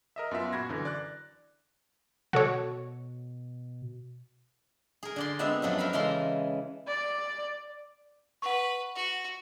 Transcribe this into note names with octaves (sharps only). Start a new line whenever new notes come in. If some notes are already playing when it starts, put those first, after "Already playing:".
A#4 D#5 E5
F#2 B3 F4 E5
A#2 F#4 B5 G#6 A#6
F#2 D3 E3
D5 F#6
B2 F#4 A4 C#5
G#4 A#4
D3 D5 C6
G#3 B3 C4 D4 E5 F5
F#2 F3 F#3 D4
A#4 E5 F5 B5
C#3 E3 G#3 A4 A#5 C6
D5
B4 F#5 C#6
F#4